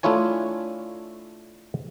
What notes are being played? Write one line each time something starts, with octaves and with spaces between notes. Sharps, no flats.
A3 D4 E4 F4 C#5 G#5